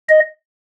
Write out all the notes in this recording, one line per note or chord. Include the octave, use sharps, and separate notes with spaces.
D#5